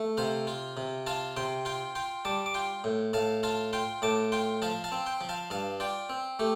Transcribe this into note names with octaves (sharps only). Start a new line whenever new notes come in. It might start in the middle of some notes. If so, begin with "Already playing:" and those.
Already playing: A3
C3 C5 F5
F4
C3
F4 F5 A5
C3 G5 C6
F4 G5 C6
F4 G5 C6
G3 A5 D6
D6
F4 G5 C6
A2
A2 F5 A5
F4 F5 A5
F4 G5 C6
A2 A5 D6
F4 G5 C6
F3 F5 A5
F5 A5
C4
G5 C6
F3
F5 A5
G2 F5 A5
F4 D5 G5
C4
A3 G4